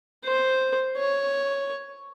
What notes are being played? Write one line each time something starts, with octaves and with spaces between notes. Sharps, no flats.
C5
C#5